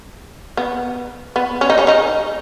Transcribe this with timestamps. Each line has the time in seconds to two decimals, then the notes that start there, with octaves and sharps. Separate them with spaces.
0.57 B3
1.36 B3
1.61 C#4
1.70 D#4
1.78 C#3 C#4
1.87 D#3 D#4